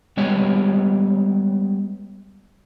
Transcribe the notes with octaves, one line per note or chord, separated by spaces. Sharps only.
G3 G#3 B3 G4 C#5 D#5